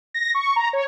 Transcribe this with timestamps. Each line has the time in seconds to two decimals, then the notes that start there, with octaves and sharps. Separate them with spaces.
0.14 A#6
0.35 C#6
0.56 A#5
0.73 C#5